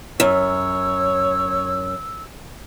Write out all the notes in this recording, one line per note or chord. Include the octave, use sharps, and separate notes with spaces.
F#2 C#5 E6